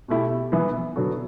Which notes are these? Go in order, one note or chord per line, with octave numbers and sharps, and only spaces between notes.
B2 A3 E4 G4
E3 B3 E4
D3 F#3 B3 F#4 A4